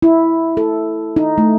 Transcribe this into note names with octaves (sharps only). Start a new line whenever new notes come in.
E4
A4
D#4
A3